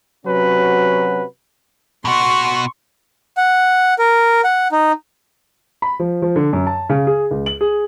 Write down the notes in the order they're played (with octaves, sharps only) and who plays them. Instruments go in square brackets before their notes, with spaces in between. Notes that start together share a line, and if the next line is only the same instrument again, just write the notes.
[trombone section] C3 F#3 C#4 F#4 B4
[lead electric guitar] B2 F#4 [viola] C6 C#6
[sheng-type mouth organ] F#5
A#4
F#5
D#4
[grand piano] B5
F3
F3
D3
F#2
A5
C#3
G#4
C#2
F#7
G#4